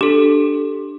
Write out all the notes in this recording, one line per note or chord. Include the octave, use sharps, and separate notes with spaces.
D4 G4 A4